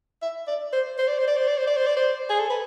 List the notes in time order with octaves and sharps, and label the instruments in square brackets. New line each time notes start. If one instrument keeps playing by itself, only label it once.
[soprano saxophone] E5
D5
C5
C5
D5
C5
D5
C5
D5
C5
D5
C5
D5
C5
G#4
A4
B4